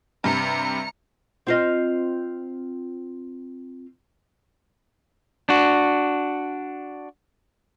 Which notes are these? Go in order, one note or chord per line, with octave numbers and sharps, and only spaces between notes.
G2 C3 A#5 C#7
C4 F4 D#5
D4 F#4